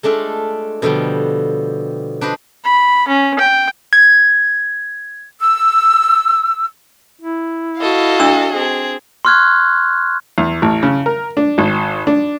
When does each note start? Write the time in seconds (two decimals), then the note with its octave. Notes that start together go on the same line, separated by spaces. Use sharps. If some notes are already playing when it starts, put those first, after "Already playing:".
0.03 G#3 A3 D4 F4 A4
0.82 B2 D3 F3 G3
2.21 D4 B4 C5 D#5
2.64 B5
3.08 C#4
3.39 G5
3.93 G#6
5.40 E6
7.21 E4
7.81 F#4 A4 D#5 F5
8.20 D4 E6
8.53 C4 G#4
9.25 C6 C#6 F6 F#6 G#6
10.38 E2
10.62 A1
10.83 C#3
11.06 A#4
11.37 D4
11.58 G#1
12.07 D4